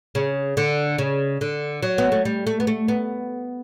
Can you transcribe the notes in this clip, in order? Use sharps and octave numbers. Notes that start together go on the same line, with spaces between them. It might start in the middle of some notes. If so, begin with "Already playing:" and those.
C#3
D3
C#3
D3
F#3
B3
A3
G3
A3
B3
A3
B3